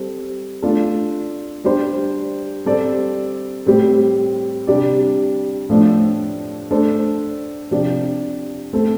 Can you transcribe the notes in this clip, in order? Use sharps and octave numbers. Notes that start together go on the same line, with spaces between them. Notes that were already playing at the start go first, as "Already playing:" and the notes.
Already playing: G3 C4 A4
A3 D4 F4 A4
G3 D4 G4 C5
G3 C4 A4 D5
A2 G3 C4 G4
C3 G3 D4 G4 D5
A2 F3 A3 D4
A3 D4 A4 C5
C3 F3 D4 G4 D5
A3 C4 A4